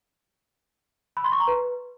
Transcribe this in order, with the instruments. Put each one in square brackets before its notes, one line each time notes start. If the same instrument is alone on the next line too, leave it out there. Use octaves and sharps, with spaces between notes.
[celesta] B5
C6
C#6
A#5
B4